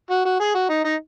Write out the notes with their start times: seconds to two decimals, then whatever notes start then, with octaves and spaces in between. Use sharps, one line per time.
0.10 F#4
0.25 F#4
0.40 G#4
0.55 F#4
0.70 D#4
0.84 D#4